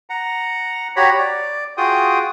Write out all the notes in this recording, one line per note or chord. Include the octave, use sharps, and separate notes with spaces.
F#5 A#5
F#4 G4 C#5 A#5 B5
D5
F4 F#4 G#4 G5 D#6